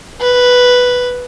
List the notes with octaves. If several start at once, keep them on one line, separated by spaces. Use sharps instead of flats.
B4